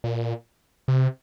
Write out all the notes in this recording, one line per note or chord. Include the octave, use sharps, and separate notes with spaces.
A#2
C3